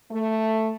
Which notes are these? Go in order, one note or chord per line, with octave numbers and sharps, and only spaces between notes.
A3